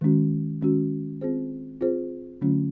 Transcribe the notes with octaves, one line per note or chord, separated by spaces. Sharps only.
D#3 G#3 C#4 F#4
D#3 G#3 C#4 F#4
C4 F4 G#4 C5
C4 F4 G#4 C5
D3 F#3 A3 C#4 F4